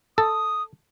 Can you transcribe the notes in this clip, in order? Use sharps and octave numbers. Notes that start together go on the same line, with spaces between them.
A4 D#6